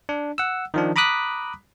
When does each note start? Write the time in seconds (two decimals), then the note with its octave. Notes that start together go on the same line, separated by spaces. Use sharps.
0.09 D4
0.38 F#5 E6
0.74 D#3 F3 D4
0.96 A#5 B5 D6 D#6 F#6 B6